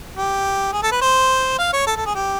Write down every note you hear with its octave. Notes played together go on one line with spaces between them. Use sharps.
G4
G#4
A4
B4
C5
F5
C#5
A4
A4
G#4
G4